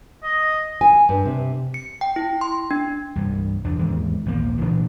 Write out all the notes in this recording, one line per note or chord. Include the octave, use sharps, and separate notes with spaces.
D#5
G#5
G2
C3
C#7
G5
E4
C6
D4
C2 G2
E2 D4
D#2 G#2 E3
A#1 D#2 F3 A#3
A#2 E3 F#3 D4